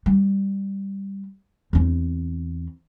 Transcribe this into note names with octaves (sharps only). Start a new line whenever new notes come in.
G3
E2 C4